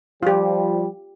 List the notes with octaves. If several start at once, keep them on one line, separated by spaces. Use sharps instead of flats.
F3 G3 F4 G4